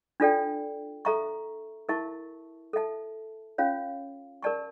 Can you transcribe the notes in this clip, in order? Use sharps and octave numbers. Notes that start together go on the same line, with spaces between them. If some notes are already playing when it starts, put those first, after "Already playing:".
D4 F4 A4 D5 G5
A4 E5 A#5 C#6
E4 A#4 E5 A5 C#6
A4 E5 A5
C#4 F4 C#5 F5
A#4 D5 A5 C#6